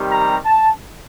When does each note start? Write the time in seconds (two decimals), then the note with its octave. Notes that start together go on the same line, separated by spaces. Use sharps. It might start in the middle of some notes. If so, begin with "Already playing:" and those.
Already playing: C3 D#3 G3
0.11 A#5
0.45 A5